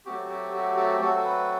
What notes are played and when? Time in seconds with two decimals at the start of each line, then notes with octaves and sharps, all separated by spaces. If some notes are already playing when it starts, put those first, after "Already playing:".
0.05 F#3 A3 C4 F#4 G4
0.30 G4
0.53 G4
0.77 G4
1.00 F#3 A3 C4 F#4 A4
1.16 A4
1.25 B4